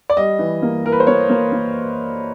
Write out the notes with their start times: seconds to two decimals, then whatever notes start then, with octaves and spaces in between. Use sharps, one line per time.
0.10 D5
0.17 G3 D#5
0.39 E3
0.62 A#3
0.85 E3 A#4
0.92 B4
1.00 C5
1.07 A#3 C#5
1.30 A#3
1.52 A#3